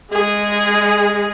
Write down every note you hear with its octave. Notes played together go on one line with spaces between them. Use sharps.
G#3 G#4